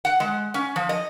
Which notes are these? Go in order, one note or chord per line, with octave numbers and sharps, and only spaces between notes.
F#5
G#3
C#4
F3
D#5